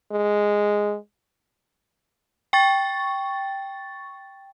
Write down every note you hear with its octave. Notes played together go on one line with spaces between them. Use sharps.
G#3
G5 C#6 A6